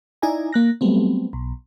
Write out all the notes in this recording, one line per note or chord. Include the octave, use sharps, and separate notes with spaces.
D#4 E4 D5 G#5 A#5
A#3 F#6 A#6
F#3 G3 A3 B3 C4
B1